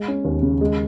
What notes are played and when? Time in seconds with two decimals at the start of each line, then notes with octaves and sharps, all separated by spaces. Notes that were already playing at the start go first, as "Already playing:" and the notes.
Already playing: G#3
0.08 C#4
0.25 D#2
0.42 C#3
0.61 G#3